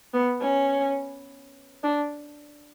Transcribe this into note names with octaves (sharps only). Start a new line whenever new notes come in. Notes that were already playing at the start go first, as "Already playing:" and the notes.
B3
C#4
D4